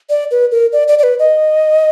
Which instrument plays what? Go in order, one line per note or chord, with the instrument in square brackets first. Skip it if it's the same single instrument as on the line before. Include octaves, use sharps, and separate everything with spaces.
[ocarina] D5
B4
A#4
D5
D5
D5
B4
D#5